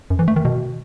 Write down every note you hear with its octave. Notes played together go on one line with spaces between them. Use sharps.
F#2
E3
A3
D#3
B2